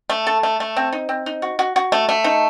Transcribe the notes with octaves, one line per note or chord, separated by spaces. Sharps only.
A3
A4
A3
A3
C4
D#4
C4
D#4
F#4
F#4
F#4
A3
A3
D#4